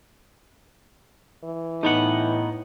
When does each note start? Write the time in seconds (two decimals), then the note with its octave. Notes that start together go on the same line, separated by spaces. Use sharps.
1.44 E3
1.83 A2 A3 B3 D#4 F#5